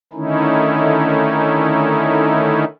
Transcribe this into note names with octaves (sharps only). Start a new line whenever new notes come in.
D3 D#3 A3 C#4 D#4 E4